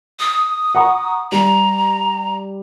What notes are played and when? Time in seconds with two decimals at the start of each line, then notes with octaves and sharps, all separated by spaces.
0.19 D#6
0.75 F#5 A#5 C#6
1.32 G3 A#5